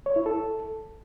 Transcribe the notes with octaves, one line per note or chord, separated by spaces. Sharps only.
C#5
E4
A4